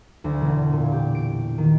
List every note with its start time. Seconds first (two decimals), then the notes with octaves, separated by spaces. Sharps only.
0.24 D2
0.41 E1
0.73 A#2
0.92 G4
1.15 D7
1.58 D#3